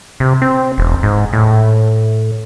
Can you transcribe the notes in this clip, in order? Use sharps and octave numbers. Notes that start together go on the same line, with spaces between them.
C3
C4
E1
G#2
A2